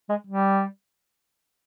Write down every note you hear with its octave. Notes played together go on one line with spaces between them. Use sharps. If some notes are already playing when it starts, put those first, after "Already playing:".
G#3
G3